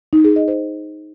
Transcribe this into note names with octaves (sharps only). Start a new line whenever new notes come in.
D#4
G#4
D#5
C5